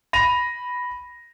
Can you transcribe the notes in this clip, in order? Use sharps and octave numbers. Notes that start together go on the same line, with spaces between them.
B5 A#6 D#7 F7